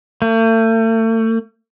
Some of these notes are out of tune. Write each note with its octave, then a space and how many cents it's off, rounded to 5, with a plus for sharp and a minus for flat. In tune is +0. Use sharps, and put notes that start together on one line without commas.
A3 +40